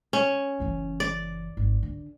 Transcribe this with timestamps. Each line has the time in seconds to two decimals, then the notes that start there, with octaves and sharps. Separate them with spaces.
0.13 C#4
0.60 F#1 E3
1.00 D5
1.57 G#1
1.83 D3